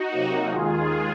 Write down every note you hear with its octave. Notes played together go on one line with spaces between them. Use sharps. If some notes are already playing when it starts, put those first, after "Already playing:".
Already playing: D#4 F#4
C3 F#3 A#3
D#2 D#3 G#3 F4 G#4